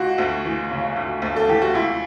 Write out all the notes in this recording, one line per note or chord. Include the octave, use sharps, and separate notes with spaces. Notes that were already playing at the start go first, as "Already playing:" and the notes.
Already playing: C#2 F#4
D2
E3
C#3
D2
D2
A4
E3 G4
F#4
C#2 E4